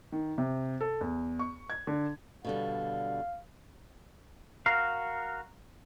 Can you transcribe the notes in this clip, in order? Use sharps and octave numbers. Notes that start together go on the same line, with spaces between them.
D#3
C3
A4
E2
C#6
G#6
D3
B2 D3 G3 F5
F#4 A#4 F5